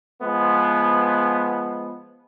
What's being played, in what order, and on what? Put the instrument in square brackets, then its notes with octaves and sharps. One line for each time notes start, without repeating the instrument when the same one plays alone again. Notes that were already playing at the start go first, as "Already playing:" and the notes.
[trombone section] F3 G#3 B3